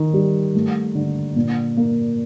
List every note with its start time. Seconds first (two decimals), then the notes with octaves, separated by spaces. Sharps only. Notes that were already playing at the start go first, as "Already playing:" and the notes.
Already playing: D#3
0.13 G3
0.55 A3
0.95 D3
1.36 A#2
1.77 A#3